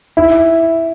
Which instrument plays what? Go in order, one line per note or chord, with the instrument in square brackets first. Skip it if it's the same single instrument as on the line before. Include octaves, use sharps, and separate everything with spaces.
[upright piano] E4